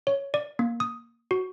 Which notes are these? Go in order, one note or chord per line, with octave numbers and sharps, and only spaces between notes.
C#5
D5
A#3
D#6
F#4